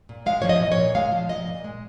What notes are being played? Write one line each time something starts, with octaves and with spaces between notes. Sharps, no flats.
A#2
G#3 F5
F3 C#5
D#5
A#2
C#5
A#2
G#3 F5
F3
A#2 D#5
A#2
G#3